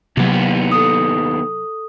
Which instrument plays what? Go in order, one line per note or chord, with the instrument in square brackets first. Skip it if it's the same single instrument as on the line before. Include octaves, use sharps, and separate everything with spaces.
[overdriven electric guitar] D#2 B3 [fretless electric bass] C3 F#3
[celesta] A4 D#6